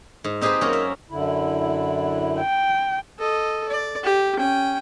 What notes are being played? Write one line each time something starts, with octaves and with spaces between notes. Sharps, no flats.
G#2
C4 D#4 G4 G#4 B4 C5
F#2 A#3 C#4 F#4
E5
F#2 D3 E4
G5
A4 D#5
D5
G4
C#4 G5